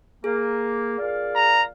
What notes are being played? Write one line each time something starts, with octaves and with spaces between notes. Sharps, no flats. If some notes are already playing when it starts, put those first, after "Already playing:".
A#3 G#4
A#2 D5 F5
A#5